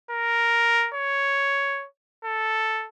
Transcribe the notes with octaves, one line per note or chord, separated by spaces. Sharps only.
A#4
C#5
A4